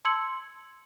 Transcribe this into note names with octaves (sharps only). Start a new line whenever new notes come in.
A5 C6 E6 G#6 C#7 F#7